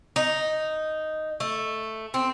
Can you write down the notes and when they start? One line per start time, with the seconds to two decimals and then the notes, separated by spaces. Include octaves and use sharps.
0.16 D#4
1.40 A3
2.14 C4